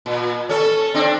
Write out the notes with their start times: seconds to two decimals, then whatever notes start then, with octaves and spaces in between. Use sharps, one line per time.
0.06 A#2
0.49 C#4 A4
0.94 C4 D4